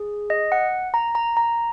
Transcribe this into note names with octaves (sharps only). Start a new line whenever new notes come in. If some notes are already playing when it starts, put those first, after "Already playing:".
Already playing: G#4
D#5
F#5
A#5
A#5
A#5